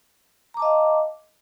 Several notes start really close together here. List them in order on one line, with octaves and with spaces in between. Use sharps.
A#5 D6 A5 D#5 F5